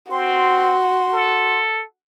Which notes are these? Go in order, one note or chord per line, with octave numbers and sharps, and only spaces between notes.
C4 F#4 C6
A4